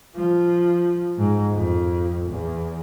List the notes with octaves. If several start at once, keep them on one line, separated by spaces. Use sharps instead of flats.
F3
G#2
F2
E2